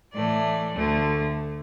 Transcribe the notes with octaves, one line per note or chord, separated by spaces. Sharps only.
A2 E3 A3 D5
D2 D3 A3